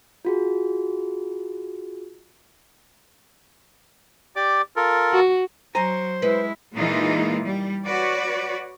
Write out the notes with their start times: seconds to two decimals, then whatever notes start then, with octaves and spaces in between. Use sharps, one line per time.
0.25 F4 F#4 G#4
4.36 G4 D5 D6
4.76 F4 A4 A#4
5.13 F#4
5.75 F#3 C5 G#5 A#5
6.22 G#3 E4 B4
6.75 A#2 E3 G#3 A#3 D#4 F4
7.44 G3
7.84 F#4 B4 C#5 D5